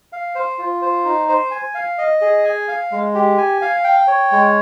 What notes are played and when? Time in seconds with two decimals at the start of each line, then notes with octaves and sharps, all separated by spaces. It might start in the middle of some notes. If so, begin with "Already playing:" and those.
0.13 F5
0.35 C5
0.58 F4
0.82 C5
1.05 D#4
1.29 C5
1.51 G#5
1.74 F5
1.98 D#5
2.21 G#4
2.44 G#5
2.68 F5
2.92 G#3
3.15 G4
3.38 G#5
3.62 F5
3.84 G5
4.07 C#5
4.32 G#3